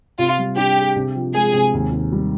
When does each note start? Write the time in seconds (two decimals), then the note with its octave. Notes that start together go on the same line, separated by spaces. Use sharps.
0.19 C3 F4
0.38 G3
0.57 D4 G4
0.76 G#4
0.96 C3
1.15 F3
1.34 G#3 G#4
1.53 C3
1.73 D#2
1.92 D#3
2.12 G3